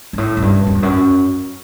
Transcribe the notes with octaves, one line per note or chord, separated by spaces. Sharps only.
G2
A2
F#2
G2
F#2
E2
F#2